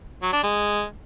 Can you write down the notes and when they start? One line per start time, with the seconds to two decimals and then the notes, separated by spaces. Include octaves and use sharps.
0.23 F#3
0.33 D4
0.43 G#3